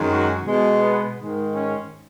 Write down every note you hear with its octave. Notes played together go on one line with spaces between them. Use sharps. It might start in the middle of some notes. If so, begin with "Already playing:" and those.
Already playing: F#2 D#3 G#3
F#4
B2 G#3
B3
G#2 D#3 G#3
C#4